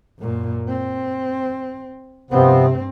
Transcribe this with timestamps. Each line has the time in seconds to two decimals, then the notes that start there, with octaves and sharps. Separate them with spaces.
0.19 F#2 A#2
0.68 C4
2.31 G2 C3 F3 B3 C4